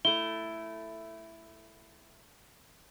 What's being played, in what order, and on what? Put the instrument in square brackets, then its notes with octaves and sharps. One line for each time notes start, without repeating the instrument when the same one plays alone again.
[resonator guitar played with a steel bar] A3 E4 [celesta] G7